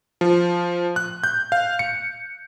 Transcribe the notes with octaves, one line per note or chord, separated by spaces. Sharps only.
F3
F#6
G6
F5
C#7